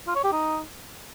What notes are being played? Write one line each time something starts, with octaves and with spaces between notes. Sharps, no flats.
F4
C#5
G4
D#4